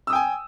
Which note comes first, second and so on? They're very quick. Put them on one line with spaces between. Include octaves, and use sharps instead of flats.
E6 D#6 G5 G#5